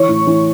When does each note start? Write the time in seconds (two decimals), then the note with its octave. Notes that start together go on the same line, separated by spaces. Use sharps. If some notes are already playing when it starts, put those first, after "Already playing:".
Already playing: E3 C#5 C#6
0.09 A2
0.27 E3